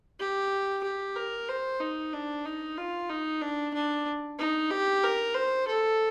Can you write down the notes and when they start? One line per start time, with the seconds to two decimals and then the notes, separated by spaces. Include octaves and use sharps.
0.20 G4
0.84 G4
1.16 A#4
1.49 C5
1.80 D#4
2.13 D4
2.45 D#4
2.78 F4
3.10 D#4
3.42 D4
3.74 D4
4.39 D#4
4.71 G4
5.03 A#4
5.35 C5
5.68 A4